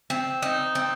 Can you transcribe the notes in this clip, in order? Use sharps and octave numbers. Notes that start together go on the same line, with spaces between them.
C4
D#4
C4